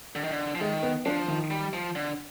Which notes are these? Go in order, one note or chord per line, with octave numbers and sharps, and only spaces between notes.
D3
D#3
D3
F3
D#3 G#3
B3
F3 D4
D#3
G3
F3
D3